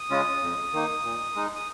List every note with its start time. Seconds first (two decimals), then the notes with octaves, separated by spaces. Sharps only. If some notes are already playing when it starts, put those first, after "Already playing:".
Already playing: D#6
0.10 C#3 G#3 C#4 F4
0.42 F2
0.73 D#3 A#3 D#4
1.04 A#2
1.35 G#3 D#4
1.56 D#6